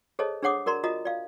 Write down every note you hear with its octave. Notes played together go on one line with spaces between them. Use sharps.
G#4 A4 C5 C#5 D#5 A5
D4 G#4 C#5 F#5 D6 D#6
F#4 A#4 D5 A#5 C6
F4 F#4 D#5 A#5 D#6
D5 F5